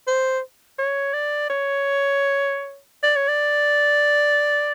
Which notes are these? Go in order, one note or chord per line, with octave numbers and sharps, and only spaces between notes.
C5
C#5
D5
C#5
D5
C#5
D5